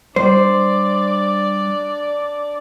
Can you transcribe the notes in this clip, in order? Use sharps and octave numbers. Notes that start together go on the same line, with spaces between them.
G3 D4 C5 D5